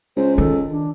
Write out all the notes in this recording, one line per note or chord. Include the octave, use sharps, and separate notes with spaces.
C#2 C5
D#3 A4
D4